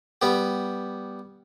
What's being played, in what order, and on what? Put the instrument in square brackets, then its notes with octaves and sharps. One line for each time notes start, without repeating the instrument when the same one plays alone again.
[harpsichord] G3 B3 G4